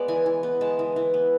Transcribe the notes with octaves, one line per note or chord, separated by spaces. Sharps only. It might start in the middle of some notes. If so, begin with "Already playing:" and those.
Already playing: G#3 B3 D5
E3 G#5
E3
B3
G#3 A5
E3
E3
B3